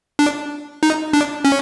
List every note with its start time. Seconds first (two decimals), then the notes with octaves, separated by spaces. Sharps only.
0.19 D4
0.83 D#4
1.13 D4
1.45 C#4